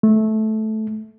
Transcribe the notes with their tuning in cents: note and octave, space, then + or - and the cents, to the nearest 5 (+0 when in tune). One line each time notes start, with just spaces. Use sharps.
A3 -15